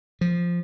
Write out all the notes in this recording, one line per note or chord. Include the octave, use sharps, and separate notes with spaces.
F3